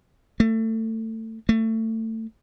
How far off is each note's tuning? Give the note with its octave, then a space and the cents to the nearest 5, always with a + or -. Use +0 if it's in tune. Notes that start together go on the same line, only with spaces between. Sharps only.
A3 +25
A3 +25